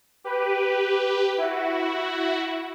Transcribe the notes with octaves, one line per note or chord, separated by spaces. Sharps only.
G4 B4
E4 F#4